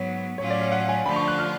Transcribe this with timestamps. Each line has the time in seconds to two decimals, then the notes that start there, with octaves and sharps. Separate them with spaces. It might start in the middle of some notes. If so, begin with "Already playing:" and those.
Already playing: G#2 F#3 B3 C#5
0.38 A2 F#3 C#4 F4 C#5
0.50 D5
0.61 F5
0.72 F#5
0.89 G#5
1.05 D3 F3 A3 D4 F4 B5
1.16 C#6
1.28 F#6
1.38 F6